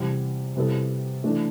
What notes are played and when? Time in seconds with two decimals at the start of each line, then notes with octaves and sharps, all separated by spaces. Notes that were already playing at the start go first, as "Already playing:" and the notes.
Already playing: E2 C3 G3
0.56 C3 G3 B3 E4 A4
1.23 E3 A3 D4 A4